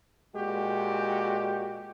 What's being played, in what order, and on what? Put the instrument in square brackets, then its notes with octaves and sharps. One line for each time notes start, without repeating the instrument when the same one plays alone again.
[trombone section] A#2 G#3 F#4 G4